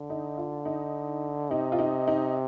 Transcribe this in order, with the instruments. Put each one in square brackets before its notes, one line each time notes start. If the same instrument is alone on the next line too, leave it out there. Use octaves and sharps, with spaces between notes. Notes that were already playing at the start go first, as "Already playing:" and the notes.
Already playing: [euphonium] D3
[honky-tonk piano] D#4
F4
D#4
[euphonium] C3 [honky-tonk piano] D#4
[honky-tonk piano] F4
D#4
D#4